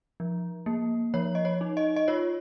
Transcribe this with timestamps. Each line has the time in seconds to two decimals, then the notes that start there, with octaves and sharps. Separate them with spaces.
0.20 F3
0.66 A#3
1.14 F3 C#5
1.35 D#5
1.45 C#5
1.61 D#4
1.77 D#5
1.96 D#5
2.08 F4 C#5